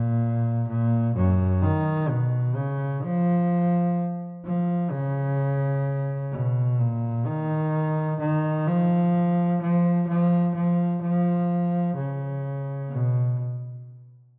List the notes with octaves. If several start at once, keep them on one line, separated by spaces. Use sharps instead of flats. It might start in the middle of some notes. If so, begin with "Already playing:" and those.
Already playing: A#2
A#2
F#2
D#3
B2
C#3
F3
F3
C#3
B2
A#2
D#3
D#3
F3
F3
F3
F3
F3
C#3
B2